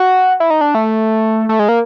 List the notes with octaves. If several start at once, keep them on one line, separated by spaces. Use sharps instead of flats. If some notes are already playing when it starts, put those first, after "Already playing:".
Already playing: F#4
E4
D#4
D4
A3
A3
G#3
A#3